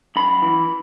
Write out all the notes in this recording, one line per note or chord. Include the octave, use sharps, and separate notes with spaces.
F#2 B5
E3